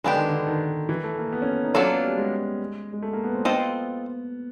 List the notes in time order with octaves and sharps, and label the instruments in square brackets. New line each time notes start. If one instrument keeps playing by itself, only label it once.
[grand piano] D3 [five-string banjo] G#3 B3 D4 G4
[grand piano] D#3
D3
D#3
E3
A3
A#3
B3
C#4
D#4
[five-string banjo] F#3 A#3 D4 F4 A4 [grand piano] C#4
[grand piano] B3
G3
G#3
G#3
A3
A#3
B3
C4
[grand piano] B3 [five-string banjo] C4 F4 A4 C5 D#5